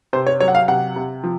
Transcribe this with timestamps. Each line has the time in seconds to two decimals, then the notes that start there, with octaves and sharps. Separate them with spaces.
0.13 C3 C5
0.27 C#5
0.40 F#3 C#5
0.48 F#5
0.55 F5
0.68 C3 F#5
0.96 C3
1.24 F3